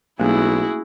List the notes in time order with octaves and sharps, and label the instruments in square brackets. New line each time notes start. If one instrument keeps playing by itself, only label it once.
[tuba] B1 [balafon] A3 A#3 C#4 [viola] E4 F#4 [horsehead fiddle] G#4